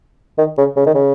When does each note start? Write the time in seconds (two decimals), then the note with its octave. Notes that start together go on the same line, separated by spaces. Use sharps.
0.38 D#3
0.58 C#3
0.77 C#3
0.86 D#3
0.95 C#3